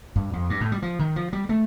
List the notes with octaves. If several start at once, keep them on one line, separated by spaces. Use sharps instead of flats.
G2
F2
G2
A2
G3
F3
D#3
F3
G3
A3